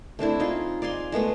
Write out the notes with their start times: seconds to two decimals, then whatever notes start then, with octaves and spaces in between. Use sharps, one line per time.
0.19 A3 C4 D4 E4
0.40 D#4 F4 G#4
0.82 D5 F5 G#5 C6
1.12 G#3 A3 B3 B4